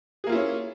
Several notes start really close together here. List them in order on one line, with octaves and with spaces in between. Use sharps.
G#4 A#3 F4 E4 C#4